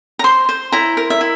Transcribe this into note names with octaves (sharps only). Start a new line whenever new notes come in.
A#5
C5 C6
C5
E4 A#5
A#4
E5
E4